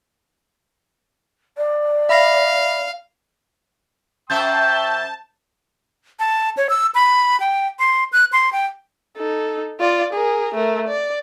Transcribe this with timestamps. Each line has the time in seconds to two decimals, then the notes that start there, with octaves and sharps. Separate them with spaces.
1.57 D5
2.09 E5 F5 B5 A#6
4.30 F#2 C5 E5 G5 A5 C#6 E6 G6
6.19 A5
6.57 C#5
6.69 E6
6.95 B5
7.40 G5
7.79 C6
8.13 F#6
8.32 C6
8.53 G5
9.17 D#4 A4
9.80 F4 D5
10.13 G#4 A#4
10.54 A3 A#4
10.87 D5